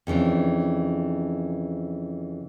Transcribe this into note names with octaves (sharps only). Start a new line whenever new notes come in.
F2 C#3 E3 D4